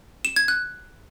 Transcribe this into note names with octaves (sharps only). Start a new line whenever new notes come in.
E7
G#6
F#6